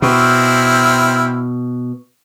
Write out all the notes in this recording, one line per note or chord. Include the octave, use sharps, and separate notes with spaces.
B2 C4 E4 F6